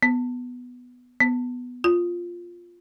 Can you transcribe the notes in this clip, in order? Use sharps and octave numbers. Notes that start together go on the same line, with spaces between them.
B3
B3
F4